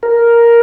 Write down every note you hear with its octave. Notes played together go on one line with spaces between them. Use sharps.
A#4